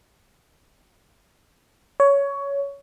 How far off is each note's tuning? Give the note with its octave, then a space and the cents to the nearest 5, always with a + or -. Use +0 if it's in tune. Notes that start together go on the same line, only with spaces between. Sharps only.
C#5 +15